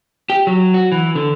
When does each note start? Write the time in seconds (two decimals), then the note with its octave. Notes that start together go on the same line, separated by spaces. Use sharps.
0.30 G4
0.47 F#3
0.74 F#4
0.92 E3
1.15 D3